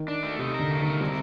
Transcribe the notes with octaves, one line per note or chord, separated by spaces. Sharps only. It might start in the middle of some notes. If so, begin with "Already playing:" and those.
Already playing: D#3
D4
A3
C3 D#4
A#4
D3
A3
D#3 A#4
C3 G3